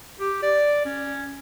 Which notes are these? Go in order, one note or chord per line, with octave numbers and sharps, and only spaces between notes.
G4
D5
C#4